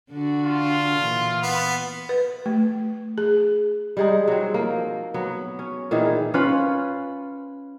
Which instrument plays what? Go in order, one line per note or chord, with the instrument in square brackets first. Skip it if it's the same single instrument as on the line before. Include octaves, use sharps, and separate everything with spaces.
[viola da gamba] D3 D4 F#4
[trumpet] F4
[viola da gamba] A#2 E3
[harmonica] B3
[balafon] B4
A3
G#4
[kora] G3 G#3 D#4
F#3 C4
F3 A#3
F#3 B3
C#4
A#2 D#3 E3 G#4
[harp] C#4 F4 B4 B5